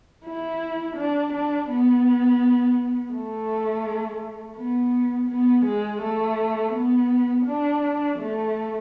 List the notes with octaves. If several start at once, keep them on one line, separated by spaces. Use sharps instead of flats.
E4
D4
D4
B3
A3
B3
B3
G#3
A3
B3
D4
A3